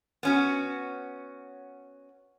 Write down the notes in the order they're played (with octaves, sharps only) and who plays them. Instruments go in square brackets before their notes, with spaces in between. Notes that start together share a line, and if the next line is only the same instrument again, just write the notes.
[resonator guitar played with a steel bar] B3 C#4 F#4